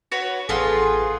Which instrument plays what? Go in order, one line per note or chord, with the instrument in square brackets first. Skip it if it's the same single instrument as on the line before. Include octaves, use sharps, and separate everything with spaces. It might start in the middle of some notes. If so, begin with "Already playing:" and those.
[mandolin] F#4 B4 C#5
[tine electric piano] A1 A4 F6 [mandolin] B3 F4 C6 [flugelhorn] G#4